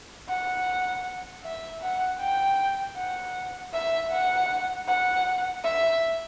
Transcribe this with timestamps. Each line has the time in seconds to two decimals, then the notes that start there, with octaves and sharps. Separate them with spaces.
0.28 F#5
1.44 E5
1.82 F#5
2.20 G5
2.97 F#5
3.73 E5
4.12 F#5
4.88 F#5
5.64 E5